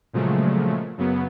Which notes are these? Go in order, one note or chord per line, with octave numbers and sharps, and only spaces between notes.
A#2 C#3 F3 F#3 G#3 A3
F#2 C#3 F#3 B3